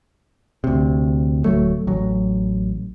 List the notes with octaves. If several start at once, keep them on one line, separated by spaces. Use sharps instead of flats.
D2 C3
D1 E2 F#3 A3
A1 F#3